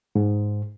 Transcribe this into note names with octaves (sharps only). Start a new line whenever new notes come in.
G#2